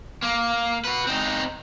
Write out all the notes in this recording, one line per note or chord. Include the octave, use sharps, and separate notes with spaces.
A#3
F#4 B4
C4 D#4